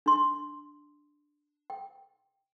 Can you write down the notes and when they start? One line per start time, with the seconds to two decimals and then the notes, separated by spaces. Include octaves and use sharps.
0.06 D4 C6
1.70 G5